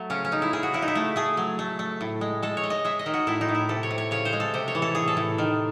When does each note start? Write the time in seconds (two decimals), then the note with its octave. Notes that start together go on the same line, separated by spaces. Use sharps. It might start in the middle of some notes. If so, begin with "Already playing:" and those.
Already playing: F#3 A3
0.10 C#3 C#4
0.25 C#4
0.32 C#3 D#4
0.42 E4
0.53 C#3 G#4
0.63 F#4
0.74 C#3 E4
0.82 D#4
0.88 E4
0.95 A3
1.16 A3 G#4
1.37 F#3
1.59 A3
1.79 A3
2.01 A2
2.21 G#3
2.42 G#3 A4
2.57 C#5
2.63 G#3
2.70 D#5
2.85 G#3 E5
2.99 D#5
3.06 D#3
3.14 F#4
3.27 A2 E4
3.41 D#4
3.49 A2
3.55 E4
3.69 C3 A4
3.83 C#5
3.91 C3
3.98 C#5
4.11 C#3 C#5
4.25 C5
4.33 G#3
4.40 A4
4.54 C3 C5
4.68 C#5
4.75 E3
4.82 A4
4.95 A2 G#4
5.08 A4
5.17 A2
5.38 D#3